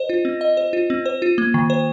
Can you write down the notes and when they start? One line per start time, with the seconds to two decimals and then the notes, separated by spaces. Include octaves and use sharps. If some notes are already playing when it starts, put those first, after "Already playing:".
Already playing: C5 D#5
0.09 F4
0.25 C4
0.41 D#5
0.57 C5
0.73 F4
0.90 C4
1.06 C5
1.22 F4
1.38 A#3
1.54 D#3
1.70 C5